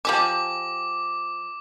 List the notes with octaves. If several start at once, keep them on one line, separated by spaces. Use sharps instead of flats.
F3 G4 G#5 D6